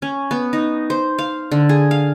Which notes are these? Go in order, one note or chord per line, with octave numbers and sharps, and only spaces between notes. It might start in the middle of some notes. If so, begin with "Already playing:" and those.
C#4
B3
D#4
C5
F5
D3
G#4
F5